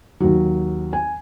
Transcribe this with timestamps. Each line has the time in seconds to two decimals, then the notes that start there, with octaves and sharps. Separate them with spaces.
0.20 D#2 F#3
0.93 G#5